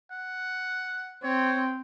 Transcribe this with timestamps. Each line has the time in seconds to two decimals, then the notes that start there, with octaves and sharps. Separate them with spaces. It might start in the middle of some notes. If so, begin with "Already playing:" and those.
0.11 F#5
1.24 C4 C#5